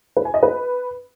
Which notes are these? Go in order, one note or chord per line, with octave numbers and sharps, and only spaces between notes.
B4
G#5
D#5
B4